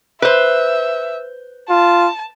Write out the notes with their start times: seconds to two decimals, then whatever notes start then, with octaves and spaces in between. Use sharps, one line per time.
0.22 B4 C5 E5
1.70 F4 A5